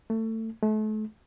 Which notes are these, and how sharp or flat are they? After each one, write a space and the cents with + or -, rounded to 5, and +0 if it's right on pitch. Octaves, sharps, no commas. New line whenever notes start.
A3 +25
A3 -35